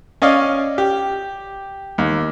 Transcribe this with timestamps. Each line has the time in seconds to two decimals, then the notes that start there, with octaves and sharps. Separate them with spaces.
0.22 C#4 D5 D#5 F5
0.78 G4
1.98 D#2